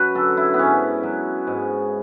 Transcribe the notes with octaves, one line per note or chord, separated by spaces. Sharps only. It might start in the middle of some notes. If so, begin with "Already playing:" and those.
Already playing: F#2 F#4 B4
D3 F#3 A4
E4
B3
G#2 C#4
F#3
G#2